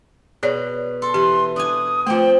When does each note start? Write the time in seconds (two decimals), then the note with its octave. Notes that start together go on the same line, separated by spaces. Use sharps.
0.43 B2 G#4 C#5 D5
1.02 A4 C6
1.14 E3 G4
1.56 D4 G#5 D#6
2.06 F3 A3 C4 F4 G5